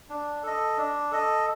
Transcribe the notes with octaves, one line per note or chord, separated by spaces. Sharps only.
D4
A4 D#5
D4
A4 D#5